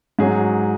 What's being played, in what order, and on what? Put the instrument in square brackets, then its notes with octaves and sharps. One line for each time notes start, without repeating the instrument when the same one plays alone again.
[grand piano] G#2 F#3 C#4 G#4